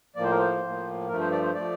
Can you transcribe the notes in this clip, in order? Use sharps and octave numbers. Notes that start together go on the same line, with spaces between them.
A2 F3 A#3 D5
C5
A#4
C5
A2 F3 A#3
G2 F3 A3 A#4
C5
D5
C5
F3 A3 D5